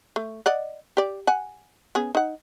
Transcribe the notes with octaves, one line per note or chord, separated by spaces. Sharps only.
A3
D5 D#5 F#5
G4 D5
F#5 G#5
B3 C#4 G#4
D#4 F#5